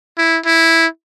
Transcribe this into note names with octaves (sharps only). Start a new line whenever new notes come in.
E4
E4